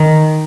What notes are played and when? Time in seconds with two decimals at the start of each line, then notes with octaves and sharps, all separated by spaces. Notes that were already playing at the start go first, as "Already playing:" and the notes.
Already playing: D#3